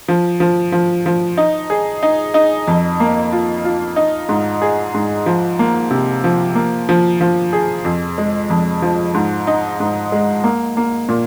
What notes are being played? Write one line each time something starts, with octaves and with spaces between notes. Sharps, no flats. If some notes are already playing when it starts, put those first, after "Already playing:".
F3
F3
F3
F3
D#4
G#4
D#4
D#4
F2
A#3
F4
F4
D#4
G#2
G#4
G#2
F3
A#3
C3
F3
A#3
F3
F3
G#4
F2
G#3
F2
F3
G#2
D#4
G#2
G#3
A#3
A#3
A#2